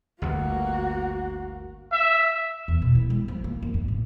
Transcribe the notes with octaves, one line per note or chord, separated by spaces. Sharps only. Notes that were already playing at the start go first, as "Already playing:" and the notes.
G1 D2 G2 A#3 F#4
E5
E2
B2
E4
G#3
F3
A#3
F#2
G2
A2